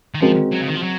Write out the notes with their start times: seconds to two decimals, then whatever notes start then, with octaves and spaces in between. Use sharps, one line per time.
0.14 D#3
0.21 F3 G#3 C4 F#4 A#4
0.52 F#3
0.61 C#3
0.68 D#3
0.76 F3
0.83 F#3